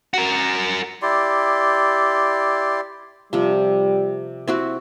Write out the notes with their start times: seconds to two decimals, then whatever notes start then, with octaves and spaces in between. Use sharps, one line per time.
0.14 F#4 A#4
1.02 E4 G4 D5 C6
3.33 C3 F3 G3
4.48 C4 E4 F#4